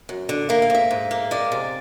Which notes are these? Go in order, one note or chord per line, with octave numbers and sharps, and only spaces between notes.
F#2
D3
A#3 E5
F5
G#2 E5
G#2
A#3
G#3 D5
C3